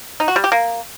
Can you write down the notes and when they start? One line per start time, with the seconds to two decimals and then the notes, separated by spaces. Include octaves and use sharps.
0.20 D#4
0.28 F#4
0.36 G3
0.44 G4
0.52 A#3